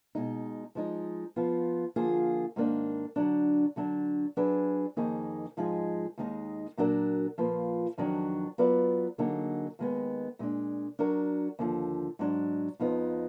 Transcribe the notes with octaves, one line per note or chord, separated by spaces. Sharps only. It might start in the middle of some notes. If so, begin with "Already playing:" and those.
B2 G#3 D#4
F3 G#3 D#4
F3 B3 F4
D3 F3 A#3 F4 G#4
G#2 D#3 A#3 D4
D3 F#3 D4
D3 F#3 D4
F#3 D4 G#4 B4
F2 D#3 A#3 D#4 G#4
G#2 F3 G#3 D#4 G#4
D#2 D#3 G#3 D#4
A#2 F#3 D4 F#4 A#4
A#2 F3 A#3 F4 B4
F2 D#3 F#3 D4 F#4
F#3 B3 F4 B4 D5
D3 F#3 A#3 D#4 G#4
D#2 D#3 G#3 B3
A#2 G#3 D4
F#3 D4 F#4 A#4
D#2 D3 F3
G#2 F#3 D4
F2 F3 B3 D#4